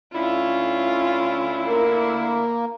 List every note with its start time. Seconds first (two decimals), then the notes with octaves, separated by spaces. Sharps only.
0.15 D2 D3 C#4 E4 F4
1.67 A#3